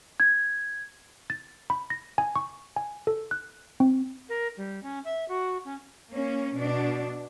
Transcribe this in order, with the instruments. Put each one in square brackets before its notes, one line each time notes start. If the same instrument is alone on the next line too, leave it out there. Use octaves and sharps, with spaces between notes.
[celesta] G#6
[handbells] A6
B5
A#6
G#5
C#6
G#5
A4
F#6
C4
[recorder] A#4
G3
C#4
E5
F#4
C#4
[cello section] A#3 C#4
B2 D4